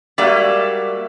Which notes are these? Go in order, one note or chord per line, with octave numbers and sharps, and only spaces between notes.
G3 G#3 A#3 F#4 D5 E5